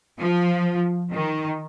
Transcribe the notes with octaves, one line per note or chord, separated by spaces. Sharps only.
F3
D#3